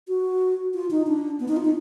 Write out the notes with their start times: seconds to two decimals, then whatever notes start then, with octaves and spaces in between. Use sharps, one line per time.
0.08 F#4
0.74 F4
0.91 D#4
1.07 D4
1.40 B3
1.48 D#4
1.57 F4
1.65 D#4